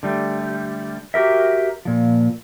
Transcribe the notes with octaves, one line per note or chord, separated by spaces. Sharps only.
D3 G3 A3
F#4 G4 A#4 E5
A#2 F3